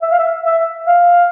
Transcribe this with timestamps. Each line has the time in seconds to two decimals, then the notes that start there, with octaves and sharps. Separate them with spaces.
0.02 E5
0.11 F5
0.19 E5
0.45 E5
0.87 F5